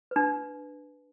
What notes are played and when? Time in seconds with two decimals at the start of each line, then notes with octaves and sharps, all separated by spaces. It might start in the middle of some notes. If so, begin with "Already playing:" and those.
0.11 D4 B4